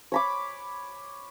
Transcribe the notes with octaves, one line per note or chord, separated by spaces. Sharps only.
C#5 B5 D6